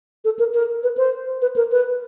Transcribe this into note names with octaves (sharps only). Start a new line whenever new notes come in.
A4
A#4
A#4
B4
C5
B4
A#4
B4